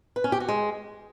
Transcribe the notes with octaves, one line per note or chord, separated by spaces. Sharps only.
B4
C#4
G4
F#4
G#3